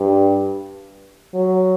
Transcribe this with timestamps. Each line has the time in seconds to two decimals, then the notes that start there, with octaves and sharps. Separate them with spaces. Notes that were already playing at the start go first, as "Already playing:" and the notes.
Already playing: G2
1.34 F#3